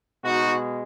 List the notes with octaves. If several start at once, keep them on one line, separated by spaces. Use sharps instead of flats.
B2 G#3 D#4 F#4